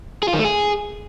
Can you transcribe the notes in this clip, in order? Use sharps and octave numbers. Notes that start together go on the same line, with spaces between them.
G#4
F4
D#3
A3
G#4